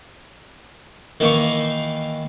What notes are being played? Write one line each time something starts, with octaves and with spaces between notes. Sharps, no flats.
D#3 E3 A#3 F5 C#6